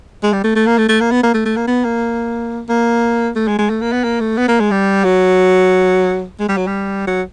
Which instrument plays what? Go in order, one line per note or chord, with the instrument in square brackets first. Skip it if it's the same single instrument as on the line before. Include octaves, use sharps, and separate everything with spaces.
[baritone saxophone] G#3
G3
A3
A3
A#3
A3
A3
A#3
B3
A#3
A3
A3
A#3
B3
A#3
A#3
A3
G#3
G#3
A3
A#3
B3
A#3
A3
B3
A#3
G#3
G3
F#3
G#3
G3
F#3
G3
F#3